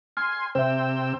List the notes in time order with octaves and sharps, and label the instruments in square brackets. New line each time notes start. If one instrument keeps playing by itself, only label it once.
[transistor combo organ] G#5 C6 [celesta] F6
[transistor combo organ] C3 G5 E6 [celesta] C5 E5